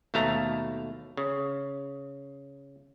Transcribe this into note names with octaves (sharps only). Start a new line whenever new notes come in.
D#2 B2 A3 F5 A#5
C#3